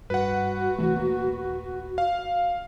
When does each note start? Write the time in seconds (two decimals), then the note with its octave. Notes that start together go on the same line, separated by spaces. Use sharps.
0.10 G2 F#4 B4 F#5
0.79 C2 E3 A3
0.97 D#1 A#3
1.98 F5